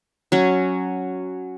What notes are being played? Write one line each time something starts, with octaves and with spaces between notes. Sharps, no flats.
F#3 C#4